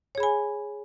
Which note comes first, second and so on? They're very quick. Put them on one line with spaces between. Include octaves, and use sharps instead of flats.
C#5 G#4 B5 G#5